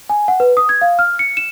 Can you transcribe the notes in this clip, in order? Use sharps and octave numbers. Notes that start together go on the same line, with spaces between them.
G#5
F#5
B4
D#6
G#6
F5
F6
C#7
E7